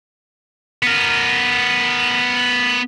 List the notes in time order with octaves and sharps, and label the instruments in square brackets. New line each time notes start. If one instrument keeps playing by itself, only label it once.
[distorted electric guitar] B3 A#4